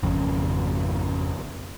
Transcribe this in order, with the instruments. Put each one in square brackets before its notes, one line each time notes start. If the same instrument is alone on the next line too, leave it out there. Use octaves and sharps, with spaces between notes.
[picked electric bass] G#1 F2 C#3